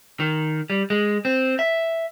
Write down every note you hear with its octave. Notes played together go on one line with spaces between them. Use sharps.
D#3
G3
G#3
C4
E5